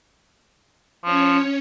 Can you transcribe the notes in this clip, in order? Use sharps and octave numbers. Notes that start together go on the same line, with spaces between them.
F3 C#4 C#5